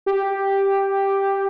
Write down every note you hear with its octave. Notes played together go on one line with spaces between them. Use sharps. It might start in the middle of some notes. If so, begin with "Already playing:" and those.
G4